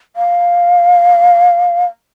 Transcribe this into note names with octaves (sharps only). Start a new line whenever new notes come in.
F5